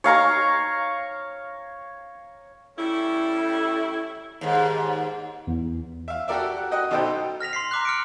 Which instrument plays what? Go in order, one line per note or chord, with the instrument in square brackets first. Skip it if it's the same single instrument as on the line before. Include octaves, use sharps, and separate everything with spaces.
[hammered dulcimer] C#5 F5 A#5 C#6
[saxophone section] G3 A3 C#4 E4
[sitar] D#2 G#2
[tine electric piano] E2
[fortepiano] E5 F5
F#4 G4 A4 A#4 D5 E5
F#5
F#4 D#5 F#5 G5
B1 B2 D#4 A4 C5 G5
[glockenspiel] F6 A#6 B6 F7
C6 B6 C7
A#5 D6 F#6
F6 C#7 D7